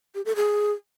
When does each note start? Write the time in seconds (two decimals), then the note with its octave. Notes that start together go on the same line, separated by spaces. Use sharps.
0.15 G4
0.25 A4
0.36 G#4